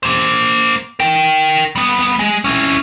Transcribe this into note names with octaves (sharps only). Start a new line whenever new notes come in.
A#3 C5
A#4 G5
G3 B3
G#3
C#4 E4